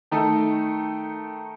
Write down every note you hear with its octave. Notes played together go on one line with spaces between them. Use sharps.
D#3 A3 D#4 A4